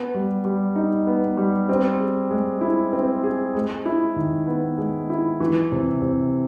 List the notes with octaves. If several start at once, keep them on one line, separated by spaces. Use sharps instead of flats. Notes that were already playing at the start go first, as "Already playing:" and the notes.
Already playing: B3
G3
G3
D#4
B3
G3
C4
G#4
G#3
E4
C4
G#4
G#3
E4
D#3
B3
G#3
E4
E3
C3
C3